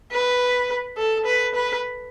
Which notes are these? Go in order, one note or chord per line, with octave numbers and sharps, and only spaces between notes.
B4
A4
B4
B4